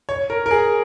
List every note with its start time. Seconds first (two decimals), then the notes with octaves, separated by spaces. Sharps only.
0.09 C#5
0.30 A#4
0.46 A#4
0.51 G#4